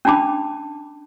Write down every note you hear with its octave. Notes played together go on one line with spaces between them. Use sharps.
C#4 D4 A5 B5 D6